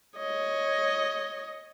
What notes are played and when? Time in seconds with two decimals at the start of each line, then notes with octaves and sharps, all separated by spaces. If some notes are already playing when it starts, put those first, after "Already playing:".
0.18 C#5 D#5